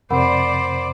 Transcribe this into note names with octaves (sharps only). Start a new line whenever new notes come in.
F2 C3 A#4 C5 D5 F#5 B5